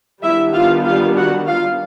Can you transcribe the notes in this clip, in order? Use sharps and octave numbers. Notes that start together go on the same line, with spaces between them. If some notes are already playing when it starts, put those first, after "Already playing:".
D#3 G3 B3 D4 E4 E5
F4 F5
F4 F5
F#4 F#5
F4 F5